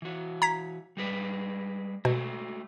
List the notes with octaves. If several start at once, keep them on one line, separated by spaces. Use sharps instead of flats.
E3 F#4
A#5 G#6 B6
G3 G#3 B4
B2 G#3 A3 F#4